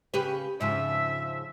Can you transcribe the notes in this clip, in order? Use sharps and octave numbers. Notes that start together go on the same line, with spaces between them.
C#3 G4 B4
G#2 C#3 F3 E5